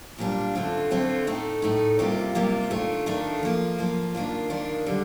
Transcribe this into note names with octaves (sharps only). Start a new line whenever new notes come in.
A#2 G3 D4 F4
D3 A3 C4 F4
D3 A3 C4 F4
A2 A3 D#4
A2 A3 D#4
C3 G3 A#3 F4
C3 G3 A#3 F4
D#3 A3 D4 F4
D#3 A3 D4 F4
F3 A#3 F4
F3 A#3 F4
D#3 A#3 D4 F4
D#3 A#3 D4 F4
D3 G3